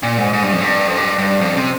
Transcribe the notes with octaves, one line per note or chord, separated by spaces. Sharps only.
A#2
G#2
G#2
G2
F2
G2
F2
G2
G2
F2
C3